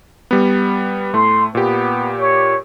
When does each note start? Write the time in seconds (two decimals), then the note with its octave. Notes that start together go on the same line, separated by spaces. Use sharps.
0.31 G3 B3
1.13 A2 A3 C6
1.55 A#2 B3 G4
2.19 C#5